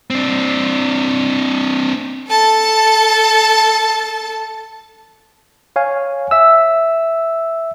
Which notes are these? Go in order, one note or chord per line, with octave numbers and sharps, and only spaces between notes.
C4 D4
A4 A5
C#5 F5 G#5
E5 E6